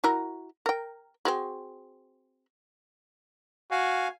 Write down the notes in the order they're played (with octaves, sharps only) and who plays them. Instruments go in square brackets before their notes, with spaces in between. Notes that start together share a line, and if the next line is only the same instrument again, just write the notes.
[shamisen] E4 F#4 A#4
A#4 G5
C4 F#4 G#4
[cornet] F#4 [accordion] F5 G#5